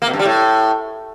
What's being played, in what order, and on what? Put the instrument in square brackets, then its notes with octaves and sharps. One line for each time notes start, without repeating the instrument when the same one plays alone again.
[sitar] A#3
B2
G2
G3
A2